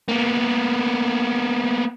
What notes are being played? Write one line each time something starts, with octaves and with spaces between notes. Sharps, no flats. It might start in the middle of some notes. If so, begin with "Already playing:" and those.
A#3 B3